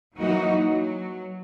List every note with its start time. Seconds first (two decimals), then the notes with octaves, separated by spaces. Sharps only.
0.17 E3 F#3 A#3 D#4 F#4
0.58 F#3